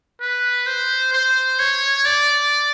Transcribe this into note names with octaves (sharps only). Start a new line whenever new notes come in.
B4
C5
C5
C#5
D5